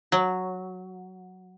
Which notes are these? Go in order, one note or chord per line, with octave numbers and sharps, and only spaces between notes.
F#3